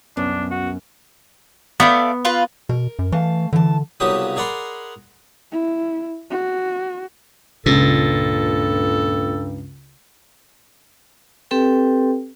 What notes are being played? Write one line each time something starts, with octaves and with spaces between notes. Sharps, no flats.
C2 F#2 B3 C#4 D4
F#4
A3 B3 D5 F5
F4 B4
B2 A#4
F#2
E3 A3 F5 A5
D3 E3 A5
C2 C#3 F#3 B3 G4 D#6
G#4 A#4 D5 F#5 B5 C6
E4
F#4
C#2 G2 A#2 A4
C4 G4 A4 B4 G5